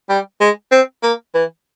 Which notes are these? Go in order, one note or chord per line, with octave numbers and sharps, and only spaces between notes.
G3
G#3
C4
A#3
E3